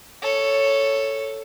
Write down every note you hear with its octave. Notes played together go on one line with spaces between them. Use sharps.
A4 C#5